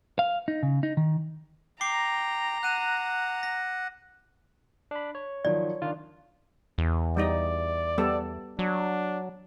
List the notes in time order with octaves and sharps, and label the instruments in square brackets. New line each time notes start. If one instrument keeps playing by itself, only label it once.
[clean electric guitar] F5
D#4
C#3
D#4
D#3
[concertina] G5 [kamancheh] A#5 [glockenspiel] D6 C7 G7
[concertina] F#5 [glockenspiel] F#6 D#7 E7
[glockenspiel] A#6
[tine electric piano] D4 B5
C#5
[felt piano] D#3 F3 F#3 [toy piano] D5
[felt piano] D#3 D4 [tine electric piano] F4
[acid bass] E2
[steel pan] G3 D#4 D#5 [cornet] D5
[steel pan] G3 B3 A4
[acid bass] F#3 [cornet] D4